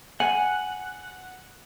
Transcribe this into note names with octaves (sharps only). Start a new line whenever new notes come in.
F#5 G#5